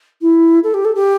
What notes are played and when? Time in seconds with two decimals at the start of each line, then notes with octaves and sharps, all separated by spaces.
0.21 E4
0.63 A4
0.74 G4
0.85 A4
0.95 G4